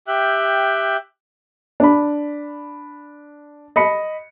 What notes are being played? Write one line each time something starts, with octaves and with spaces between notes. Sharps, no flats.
G4 E5 G5 F#6
D4 B5
D#5 B5 C#7